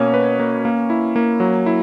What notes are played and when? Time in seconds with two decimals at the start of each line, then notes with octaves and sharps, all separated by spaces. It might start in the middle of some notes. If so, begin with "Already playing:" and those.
Already playing: B2 A#3 C#4
0.14 B4
0.40 A#3
0.65 A#3
0.90 E4
1.16 A#3
1.40 F#3
1.66 E4